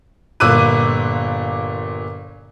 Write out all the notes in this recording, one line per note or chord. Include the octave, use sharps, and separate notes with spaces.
G1 A#2 D6 E6 F#6 D#7